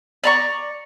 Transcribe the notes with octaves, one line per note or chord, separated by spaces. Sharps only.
D5 A#5 C#6